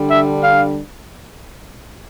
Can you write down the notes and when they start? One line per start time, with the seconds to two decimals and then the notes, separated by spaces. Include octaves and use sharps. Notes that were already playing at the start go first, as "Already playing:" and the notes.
Already playing: D3 G3 D4
0.11 E5
0.43 F5